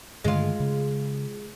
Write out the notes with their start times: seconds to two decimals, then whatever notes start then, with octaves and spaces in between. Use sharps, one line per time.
0.24 G2 D3 D#3 G#3 F4
0.60 C#3